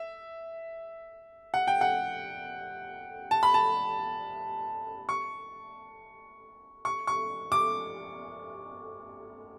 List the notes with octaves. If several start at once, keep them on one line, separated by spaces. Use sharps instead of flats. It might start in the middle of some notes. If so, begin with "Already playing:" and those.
Already playing: E5
F#5
G5
F#5
A5
B5
A5
C#6
C#6
C#6
D6